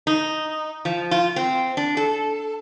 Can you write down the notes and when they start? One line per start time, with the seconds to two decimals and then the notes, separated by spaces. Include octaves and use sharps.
0.07 D#4
0.85 F3
1.11 F4
1.36 C4
1.77 D4
1.97 A4